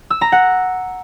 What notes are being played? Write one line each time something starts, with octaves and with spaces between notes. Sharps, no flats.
E6
A#5
F#5